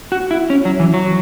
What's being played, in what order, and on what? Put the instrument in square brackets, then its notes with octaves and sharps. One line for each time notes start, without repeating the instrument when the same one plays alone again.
[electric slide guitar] F#4
E4
C#4
F#3
E3
F#3